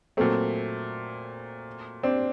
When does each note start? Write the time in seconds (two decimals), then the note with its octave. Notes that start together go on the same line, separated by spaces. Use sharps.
0.17 A#2 F#3 A3 C4
2.03 C4 D4